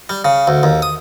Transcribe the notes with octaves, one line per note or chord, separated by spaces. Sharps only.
G3
C#3
D2
D#2
D#6